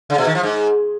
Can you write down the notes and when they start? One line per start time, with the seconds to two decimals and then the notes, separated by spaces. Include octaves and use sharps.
0.10 C#3
0.18 B2
0.27 D#3
0.35 F3
0.43 G#2